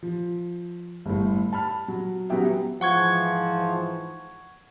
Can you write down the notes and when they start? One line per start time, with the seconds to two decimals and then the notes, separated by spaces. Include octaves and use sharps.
0.03 F3
1.06 G1 A2
1.53 A5 B5 F6
1.88 F#3
2.30 F#3 B3 C#4 G4 E5
2.81 G#2 E3 F3 F#5 C#6 G#6